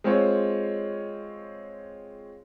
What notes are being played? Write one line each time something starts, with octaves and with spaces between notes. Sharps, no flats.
G#3 C4 F4 C5 C#5